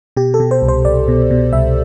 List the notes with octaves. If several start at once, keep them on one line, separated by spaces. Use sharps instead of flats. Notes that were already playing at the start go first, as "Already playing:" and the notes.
B2 G4
A4
B2
C5
C2
C5
C2 D5
B2
B2
C2 E5